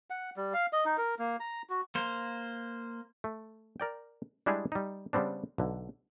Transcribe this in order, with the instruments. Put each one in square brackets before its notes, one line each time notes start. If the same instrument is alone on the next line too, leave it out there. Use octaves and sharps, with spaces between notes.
[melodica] F#5
G3
F5
D#5
D#4
A#4
A#3
A#5
F#4
[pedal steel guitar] A#3 C5
[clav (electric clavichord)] A3
A#4 D5 G5
G3 G#3 D4 E4 G4 G#4
G3 D#4
C#3 G3 B3 C4 D4
B1 D3